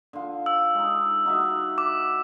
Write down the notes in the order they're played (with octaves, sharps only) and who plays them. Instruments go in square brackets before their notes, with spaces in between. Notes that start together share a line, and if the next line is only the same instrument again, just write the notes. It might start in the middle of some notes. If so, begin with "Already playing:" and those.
[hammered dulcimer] D3 F4
[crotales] E6
[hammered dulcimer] G#3 D#4
D#4 F#4 E5
[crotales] D6